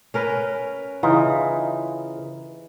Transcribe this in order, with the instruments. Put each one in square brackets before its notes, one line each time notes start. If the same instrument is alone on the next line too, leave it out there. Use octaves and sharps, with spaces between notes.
[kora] C#4 A#4 B4
[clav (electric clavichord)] C#3 D#4 F4 [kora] E3